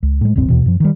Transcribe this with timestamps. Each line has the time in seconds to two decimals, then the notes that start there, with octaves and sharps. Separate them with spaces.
0.03 C#2
0.21 A2 G#3
0.36 D#1 C2 G2 C4
0.48 D#2 B2 E3
0.66 F#2 F3
0.80 D#3 G3